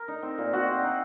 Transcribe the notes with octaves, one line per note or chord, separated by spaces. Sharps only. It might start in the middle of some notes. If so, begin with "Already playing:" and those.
Already playing: A#4
D#4
C4
A#2
C4 F#4
C4
D#4